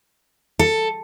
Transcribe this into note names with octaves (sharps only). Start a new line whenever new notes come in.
A4